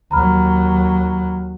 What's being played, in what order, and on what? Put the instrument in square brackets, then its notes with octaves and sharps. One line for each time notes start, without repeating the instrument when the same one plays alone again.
[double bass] D#2 F#3 [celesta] A#5 B5 F6